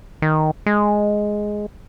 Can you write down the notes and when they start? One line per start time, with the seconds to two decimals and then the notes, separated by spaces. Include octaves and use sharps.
0.22 D#3
0.66 G#3